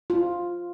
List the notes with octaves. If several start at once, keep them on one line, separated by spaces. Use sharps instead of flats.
F4